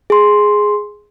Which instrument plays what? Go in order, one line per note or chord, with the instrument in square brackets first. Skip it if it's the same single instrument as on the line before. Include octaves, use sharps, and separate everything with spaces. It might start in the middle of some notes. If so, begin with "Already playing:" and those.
[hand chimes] G#4 C6